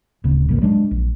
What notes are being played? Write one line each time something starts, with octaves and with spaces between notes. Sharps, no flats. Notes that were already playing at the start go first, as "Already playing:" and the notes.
D1 C#3
A1 C#3 F3 A#3
F#3 G#3 C4 D4
A#1